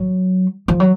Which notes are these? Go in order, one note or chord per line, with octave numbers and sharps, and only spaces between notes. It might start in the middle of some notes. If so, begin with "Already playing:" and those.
Already playing: F#3
F3
F#3